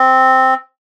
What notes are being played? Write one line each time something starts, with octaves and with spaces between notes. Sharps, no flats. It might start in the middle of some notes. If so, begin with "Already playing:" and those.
Already playing: C4